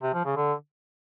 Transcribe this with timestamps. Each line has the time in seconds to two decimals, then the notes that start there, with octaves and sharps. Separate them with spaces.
0.03 C3
0.14 F3
0.25 C#3
0.36 D3